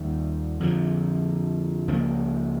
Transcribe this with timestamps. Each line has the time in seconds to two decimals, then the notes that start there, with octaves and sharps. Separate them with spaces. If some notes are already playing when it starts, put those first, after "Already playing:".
Already playing: D#2 D#3 G3
0.60 F2 D3 F3
1.88 C#2 C#3 F3 A#3